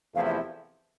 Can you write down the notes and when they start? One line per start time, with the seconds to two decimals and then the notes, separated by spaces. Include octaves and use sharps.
0.14 E2 C3 F3 A3 E4 F5
0.26 E5
0.37 E5